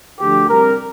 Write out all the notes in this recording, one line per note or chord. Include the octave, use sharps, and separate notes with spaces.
D2 D3 F3 G4
C2 C3 G3 A#4